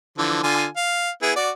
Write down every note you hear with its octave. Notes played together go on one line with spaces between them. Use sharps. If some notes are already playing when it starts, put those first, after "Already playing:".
D3 E3 F3
D3 F4 G#5
F5
B3 E4 G#4
F#4 D5